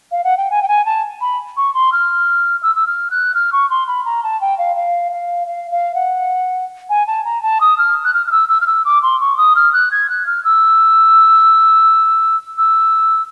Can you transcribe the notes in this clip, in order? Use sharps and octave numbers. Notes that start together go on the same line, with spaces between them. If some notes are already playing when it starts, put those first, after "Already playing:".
F5
F#5
G5
G#5
G5
G#5
A5
B5
C#6
C6
F6
E6
E6
F6
F#6
F6
C#6
C6
B5
A#5
A5
G5
F5
F5
F5
F5
F5
F#5
G#5
A5
A#5
A5
D#6
F6
F#6
F6
F6
E6
E6
F6
E6
D6
C6
C#6
D#6
F6
F#6
G#6
F#6
F6
E6
E6